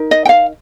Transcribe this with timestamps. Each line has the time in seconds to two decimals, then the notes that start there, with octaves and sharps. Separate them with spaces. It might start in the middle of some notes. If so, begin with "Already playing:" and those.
Already playing: D#4 A#4
0.11 D#5
0.25 G5
0.29 F5